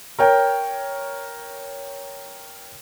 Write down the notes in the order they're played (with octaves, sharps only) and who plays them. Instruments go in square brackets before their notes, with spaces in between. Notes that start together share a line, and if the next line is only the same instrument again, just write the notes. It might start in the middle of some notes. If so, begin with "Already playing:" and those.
[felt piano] A#4 C#5 G5